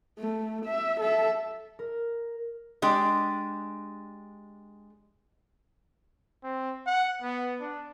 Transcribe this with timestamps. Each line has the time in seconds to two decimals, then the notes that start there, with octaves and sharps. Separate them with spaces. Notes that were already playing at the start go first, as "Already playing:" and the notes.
0.19 A3
0.65 E5
1.00 A4 E5
1.79 A#4
2.82 G#3 D4 G4
6.43 C4
6.87 F#5
7.22 B3
7.60 D4